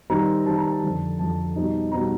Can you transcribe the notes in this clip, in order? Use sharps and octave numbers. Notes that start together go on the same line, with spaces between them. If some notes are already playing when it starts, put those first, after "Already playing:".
D#3 G3 C4 D#4 A#5
D#3 G3 C4 D#4 A5
A#5
A5
F2 D3 F3
F2 D3 F3 A5
B2 G3 C4 D#4
B2 G3 C4 D#4 A#5